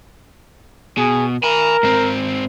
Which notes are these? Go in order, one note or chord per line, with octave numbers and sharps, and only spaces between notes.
B2 G#4
A#4 G#5 B5
G#2 C4